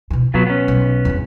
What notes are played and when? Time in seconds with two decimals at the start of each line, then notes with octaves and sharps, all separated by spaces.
0.10 B2 E3
0.34 B2 F#3 B3 F4
0.47 B3 C#4
0.68 B1
1.05 E2 G2